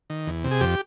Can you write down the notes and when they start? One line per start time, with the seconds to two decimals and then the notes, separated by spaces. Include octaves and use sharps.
0.10 D#3
0.27 E2
0.44 C3
0.51 G#4
0.61 F2 G4